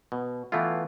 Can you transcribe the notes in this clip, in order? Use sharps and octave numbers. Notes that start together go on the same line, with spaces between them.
B2
E3 A3 B3 E4 F4